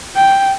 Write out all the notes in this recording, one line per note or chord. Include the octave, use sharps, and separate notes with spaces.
G5